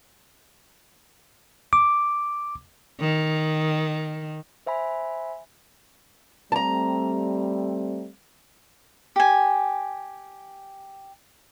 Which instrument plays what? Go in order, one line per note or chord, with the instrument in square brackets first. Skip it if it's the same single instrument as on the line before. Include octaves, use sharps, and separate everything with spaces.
[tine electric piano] D6
[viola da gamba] D#3
[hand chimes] C5 E5 G#5 B5
[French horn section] G3 A3 C4 [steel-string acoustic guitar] A5 A#5
[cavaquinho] G4 G#5